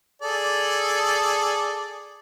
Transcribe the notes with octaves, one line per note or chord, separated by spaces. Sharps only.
G#4 A4 D5